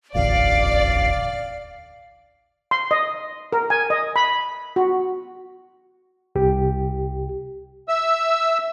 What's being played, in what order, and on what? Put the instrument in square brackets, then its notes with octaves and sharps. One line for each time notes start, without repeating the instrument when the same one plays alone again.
[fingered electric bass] E1 A1 D2 [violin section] D5 [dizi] F5
[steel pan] C6
D#5
A#4
G#5
D#5
B5
F#4
[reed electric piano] C2 G4
[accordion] E5 E6